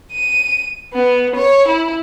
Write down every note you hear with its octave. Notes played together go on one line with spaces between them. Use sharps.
D#7
B3
C#5
E4